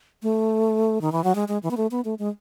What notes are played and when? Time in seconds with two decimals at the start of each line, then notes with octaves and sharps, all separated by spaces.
0.23 A3
1.01 D#3
1.12 E3
1.24 F#3
1.35 G#3
1.48 G#3
1.63 E3
1.71 B3
1.77 A3
1.91 B3
2.05 A3
2.19 G#3